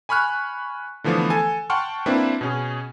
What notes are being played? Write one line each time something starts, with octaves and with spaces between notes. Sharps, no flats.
G#5 B5 C#6 F6 F#6
D3 E3 F3 A3 B3
A4 G#5
F#5 G5 A5 C6 C#6 F6
A#3 C4 D4 E4 B4
B2 C#4 G#4